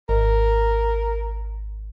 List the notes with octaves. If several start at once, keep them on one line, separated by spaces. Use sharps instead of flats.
G#1 A#4